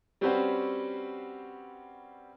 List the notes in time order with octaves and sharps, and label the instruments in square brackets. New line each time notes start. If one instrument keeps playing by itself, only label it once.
[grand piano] G3 C4 C#4 F#4 B4 C5